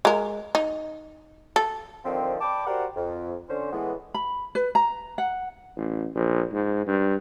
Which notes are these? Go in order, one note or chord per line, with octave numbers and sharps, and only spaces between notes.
G#3 A#4
D#4
A4
D3 D#3 F3 C4
D5 G5 A5 B5 D6
F#4 G4 A#4 C5 D5 F#5
F2
D3 C#4 C5
A2 E3 G#3 B3
B5
B4
A#5
F#5
A1
A#1
G#2
G2